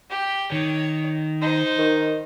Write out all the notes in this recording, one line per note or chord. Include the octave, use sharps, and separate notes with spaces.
G4
D#3 C#5
D#4 C5
D#3